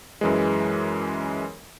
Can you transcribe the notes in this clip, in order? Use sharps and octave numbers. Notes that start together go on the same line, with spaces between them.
F#2 E3 G#3